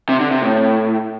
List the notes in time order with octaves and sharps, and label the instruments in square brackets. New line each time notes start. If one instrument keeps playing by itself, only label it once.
[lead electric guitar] C3
D3
C3
A2